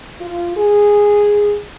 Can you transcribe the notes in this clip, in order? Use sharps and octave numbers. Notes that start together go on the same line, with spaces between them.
F4
G#4